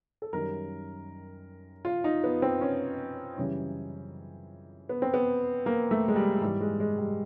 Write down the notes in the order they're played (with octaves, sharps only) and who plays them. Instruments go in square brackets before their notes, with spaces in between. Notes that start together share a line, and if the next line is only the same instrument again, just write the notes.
[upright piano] A4
F#2 D#3 G3 A#4
F4
D#4
B3
C4
C#4
F#2 C#3 E3 G3 C#4
B3
C4
B3
A#3
A3
G#3
G3
G#2 E3 G3
G#3
G#3
G3